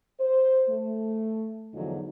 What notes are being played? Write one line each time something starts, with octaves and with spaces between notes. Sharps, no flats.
C5
A3
E2 G#2 D3 F3 F#3 D#4